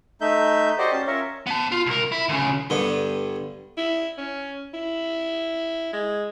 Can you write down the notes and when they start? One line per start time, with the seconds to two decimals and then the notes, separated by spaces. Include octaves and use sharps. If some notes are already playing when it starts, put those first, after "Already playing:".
0.21 A3 D#4 E5 G6
0.78 F#4 G4 C5 D5 D#5
0.92 C#4 A5
1.07 C#4 F4 A#4 C#5 E5
1.47 B3 A5
1.72 F4
1.86 C2 A#4
2.12 E4
2.29 D2 C#3
2.70 G2 D3 B3
3.77 E4
4.18 C#4
4.74 E4
5.93 G#3